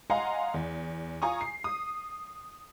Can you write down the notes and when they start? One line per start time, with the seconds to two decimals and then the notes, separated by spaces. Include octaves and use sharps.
0.10 D#5 F5 F#5 G#5 A#5 C6
0.54 E2
1.22 F4 G#5 A#5 C#6 D#6
1.41 C7
1.64 D#6